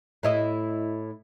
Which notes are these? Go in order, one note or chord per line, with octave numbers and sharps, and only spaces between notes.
A2 E4 D#5